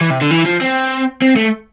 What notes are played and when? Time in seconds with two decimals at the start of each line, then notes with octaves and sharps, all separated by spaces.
0.01 E3
0.10 C3
0.21 D3
0.31 E3
0.45 F3
0.61 C4
1.22 C4
1.36 A3